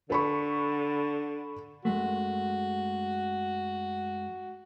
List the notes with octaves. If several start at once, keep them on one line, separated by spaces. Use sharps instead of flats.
D3 A4 B5 C#6
F#2 G#3 A3 F#4